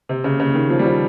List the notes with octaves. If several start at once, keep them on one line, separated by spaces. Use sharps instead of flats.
C3
C#3
C#3
D#3
F3
G3
F3